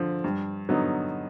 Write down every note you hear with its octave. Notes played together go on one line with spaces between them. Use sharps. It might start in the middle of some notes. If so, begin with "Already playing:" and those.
Already playing: D3 F3
G2
D3 F#3 B3 D#4